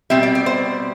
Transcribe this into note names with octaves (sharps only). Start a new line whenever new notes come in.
B2 G3 C4 E5
D5
D5
C5